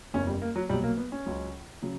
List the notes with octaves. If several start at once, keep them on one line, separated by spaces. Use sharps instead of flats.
F#1 E2 C#3 C#4
G3
A#3
F#3
B1 A#2 F#3 G3
A#3
B3
C#4
C#2 C#3 F#3
C#3 F#3